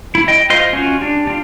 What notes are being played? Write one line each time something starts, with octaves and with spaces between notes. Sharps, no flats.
E4
D#5 G5
F4 C5 D#5 C6
C#4 F4 F#4
D4 G4
D4 F4